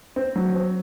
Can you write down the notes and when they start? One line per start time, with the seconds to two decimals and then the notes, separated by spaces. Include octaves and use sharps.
0.16 C4
0.36 F#3
0.54 C4